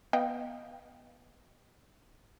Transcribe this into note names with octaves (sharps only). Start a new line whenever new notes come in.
B3 D#5 F5 G5